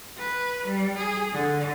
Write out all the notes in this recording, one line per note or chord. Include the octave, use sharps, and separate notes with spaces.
B4
G3
G#4
D3